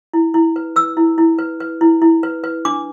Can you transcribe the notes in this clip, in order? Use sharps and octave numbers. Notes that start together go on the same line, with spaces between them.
E4
E4
B4
B4 E6
E4
E4
B4
B4
E4
E4
B4
B4
D4 D6